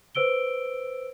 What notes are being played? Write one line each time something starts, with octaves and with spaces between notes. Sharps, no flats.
B4 C5 E6 D7 G7